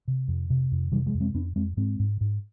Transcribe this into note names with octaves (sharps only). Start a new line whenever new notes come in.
C3
F2
C3
F2
C3 D#3 G3
F3 G#3
F2
G#3 C4
F2 B3 D4
F2 G#3 C4
G#2 G#3 C4
G#2
G#2